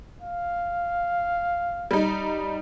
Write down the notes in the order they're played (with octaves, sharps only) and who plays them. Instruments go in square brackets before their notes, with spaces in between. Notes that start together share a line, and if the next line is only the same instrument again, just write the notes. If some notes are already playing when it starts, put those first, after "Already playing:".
[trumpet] F5
[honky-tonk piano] G3 D#4